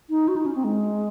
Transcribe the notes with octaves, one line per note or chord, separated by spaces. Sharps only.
D#4
F#4
D#4
C#4
C4
G#3